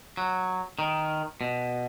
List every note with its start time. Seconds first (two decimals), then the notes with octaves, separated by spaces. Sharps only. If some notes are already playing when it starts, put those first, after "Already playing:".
0.17 F#3
0.79 D#3
1.41 B2